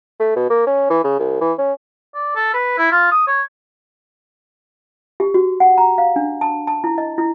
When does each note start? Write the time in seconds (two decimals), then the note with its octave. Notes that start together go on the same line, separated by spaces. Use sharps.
0.20 A3
0.36 B2
0.50 A#3
0.67 C#4
0.90 E3
1.04 C#3
1.19 C2
1.41 E3
1.58 C#4
2.15 D5
2.36 A4
2.53 B4
2.78 E4
2.92 F4
3.12 D#6
3.27 C#5
5.20 G4
5.34 F#4
5.60 F#5
5.78 A#5
5.98 F5
6.16 D4
6.41 A5
6.67 A5
6.84 E4
6.98 D#5
7.18 E4